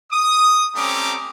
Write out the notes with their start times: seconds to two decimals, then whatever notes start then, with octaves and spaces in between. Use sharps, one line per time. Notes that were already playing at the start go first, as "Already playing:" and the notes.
0.12 D#6
0.76 G3 A3 C4 C#4 A#5 D6